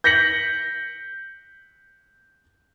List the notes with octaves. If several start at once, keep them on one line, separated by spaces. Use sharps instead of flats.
G6 A#6 B6 C#7 F#7